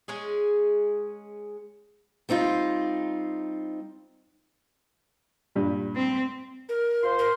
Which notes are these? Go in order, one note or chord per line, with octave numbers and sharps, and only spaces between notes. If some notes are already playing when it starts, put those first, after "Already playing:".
G#3 C#4 G#4
G3 C4 D#4 F4
G2 A#2
C4
A#4
F4 C5 C6
A#4